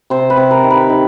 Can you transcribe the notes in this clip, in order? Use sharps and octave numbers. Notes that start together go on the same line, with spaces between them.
C3 C5
B4
C3
A#4
D#3
B4
D#3